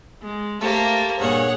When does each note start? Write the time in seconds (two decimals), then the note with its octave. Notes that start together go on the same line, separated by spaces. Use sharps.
0.22 G#3
0.61 A3 A#3 G4 C5 A5
1.19 G2 A#2 G#4 C#5 F#5